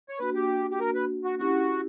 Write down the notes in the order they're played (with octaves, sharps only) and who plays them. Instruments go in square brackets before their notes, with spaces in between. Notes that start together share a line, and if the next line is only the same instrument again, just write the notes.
[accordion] C#5
[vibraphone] A#3 D4 F#4 [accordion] B4
[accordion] G4
G4
A#4
B4
F#4
[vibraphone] C#4 E4 G4 [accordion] F#4